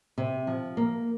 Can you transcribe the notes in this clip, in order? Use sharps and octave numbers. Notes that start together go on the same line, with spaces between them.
C3
F3
A#3